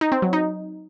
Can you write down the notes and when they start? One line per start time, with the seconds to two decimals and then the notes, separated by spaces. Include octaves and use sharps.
0.01 D#4
0.12 C4
0.22 F#3
0.33 D#4